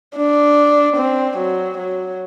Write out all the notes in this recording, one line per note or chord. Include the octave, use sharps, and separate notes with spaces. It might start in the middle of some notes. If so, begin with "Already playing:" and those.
D4
C4
F#3
F#3